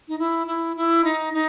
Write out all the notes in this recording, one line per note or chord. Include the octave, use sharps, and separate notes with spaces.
D#4
E4
E4
E4
D#4
D#4